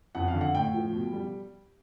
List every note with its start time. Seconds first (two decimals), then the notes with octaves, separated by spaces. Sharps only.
0.15 F2 F#5
0.28 F5
0.34 D3
0.41 F#5
0.54 A2 G5
0.74 F3
0.93 B2
1.13 G3